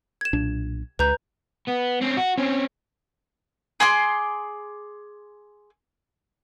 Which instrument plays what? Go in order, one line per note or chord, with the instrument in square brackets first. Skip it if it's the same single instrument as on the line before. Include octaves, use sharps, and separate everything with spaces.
[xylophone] G#6 E7
[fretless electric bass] B1 A#2 D4
[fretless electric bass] C#2 [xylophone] B4 A#5 G6
[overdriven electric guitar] B3
C4 C#4
F#4
C4 C#4
[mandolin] G#4 C6 D6